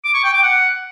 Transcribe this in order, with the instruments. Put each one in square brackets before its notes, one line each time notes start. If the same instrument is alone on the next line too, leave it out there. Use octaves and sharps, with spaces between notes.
[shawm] D6
C#6
G5
D6
F#5